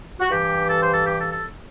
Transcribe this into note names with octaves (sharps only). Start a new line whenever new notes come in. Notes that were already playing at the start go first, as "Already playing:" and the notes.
F#4
G2 E3 G4
A4
C5
A4
G4
A4
A4